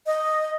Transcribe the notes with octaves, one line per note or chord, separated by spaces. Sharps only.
D#5